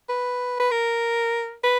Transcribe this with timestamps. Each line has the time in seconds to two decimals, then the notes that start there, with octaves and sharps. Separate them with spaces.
0.09 B4
0.60 B4
0.71 A#4
1.64 B4